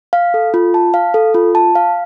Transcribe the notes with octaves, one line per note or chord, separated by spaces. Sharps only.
F5
A4
F4
A5
F5
A4
F4
A5
F5